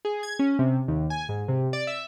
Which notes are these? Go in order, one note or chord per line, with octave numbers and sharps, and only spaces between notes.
G#4
G#6
C#4
C3
D#2
G#5
G#2
C3
D5
E5